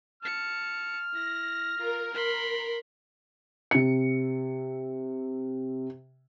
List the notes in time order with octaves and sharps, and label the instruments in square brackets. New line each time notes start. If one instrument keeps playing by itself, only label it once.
[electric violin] A5 C#7 [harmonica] F6
[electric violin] E4 [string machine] A#6
[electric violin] F4 [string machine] A#4
[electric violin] B5 C6
[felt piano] C3 C#7